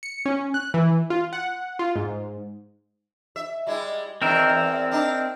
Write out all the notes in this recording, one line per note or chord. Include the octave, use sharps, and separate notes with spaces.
C#7
C#4
F#6
E3
F4
F#5
F4
G#2
E5
G3 G#3 E4
E2 B2 D#3 C4 A#4 E5
E2
D4 D#4